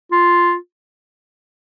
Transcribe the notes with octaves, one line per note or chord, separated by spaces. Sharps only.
F4